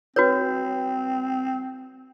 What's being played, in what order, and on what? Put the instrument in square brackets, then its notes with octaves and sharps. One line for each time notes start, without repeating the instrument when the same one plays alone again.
[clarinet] C4 [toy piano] F#4 B4 C#5